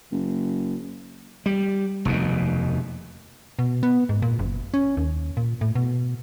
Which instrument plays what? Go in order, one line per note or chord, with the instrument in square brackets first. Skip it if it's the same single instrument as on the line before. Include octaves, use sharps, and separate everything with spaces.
[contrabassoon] F#1
[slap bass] G3
F1 D#2 B2
[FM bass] B2
B3
G#2
A#2
F#1
C#4
D#2
A#2
A2
B2